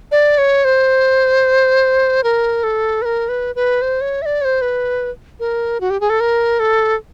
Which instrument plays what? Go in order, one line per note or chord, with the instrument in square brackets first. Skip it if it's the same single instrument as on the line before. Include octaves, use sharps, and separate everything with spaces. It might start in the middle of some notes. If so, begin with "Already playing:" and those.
[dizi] D5
C#5
C5
A#4
A4
B4
A#4
B4
B4
C5
C#5
E5
D5
C#5
C5
B4
A#4
F#4
G4
G#4
A4
A#4
A4